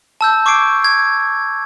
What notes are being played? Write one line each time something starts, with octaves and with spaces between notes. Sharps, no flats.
A5 E6 G6
C#6 D6 G#6 C7 D7
G#6